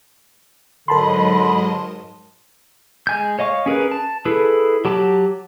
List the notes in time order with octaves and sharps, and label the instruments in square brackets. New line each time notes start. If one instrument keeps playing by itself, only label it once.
[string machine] G#2 F#3 D#5 [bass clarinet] D3 [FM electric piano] A#4 A5 C6 [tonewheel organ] B5
[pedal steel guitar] G#3 G#5 G6
C#5 D#5 F5 C#6
C#4 G#4 A#4 B4
A5
E4 G#4 A4 B4
F#3 G4 A5 D6